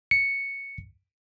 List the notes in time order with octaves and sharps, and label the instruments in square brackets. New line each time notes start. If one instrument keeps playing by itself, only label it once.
[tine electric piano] C#7